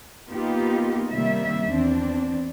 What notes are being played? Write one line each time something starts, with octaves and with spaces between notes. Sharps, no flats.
A#3 B3 D#4 F4 G4
C3 D#3 G3 A#3 E5
E2 C4 D4